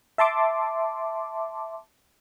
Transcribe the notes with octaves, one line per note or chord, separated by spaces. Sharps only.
E5 A5 C6 D6